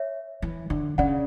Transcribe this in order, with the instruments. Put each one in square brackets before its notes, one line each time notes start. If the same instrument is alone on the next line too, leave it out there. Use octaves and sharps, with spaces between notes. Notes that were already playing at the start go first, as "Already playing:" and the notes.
Already playing: [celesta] C#5 E5
[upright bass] E3
D3
[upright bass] C#3 [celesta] D5 F#5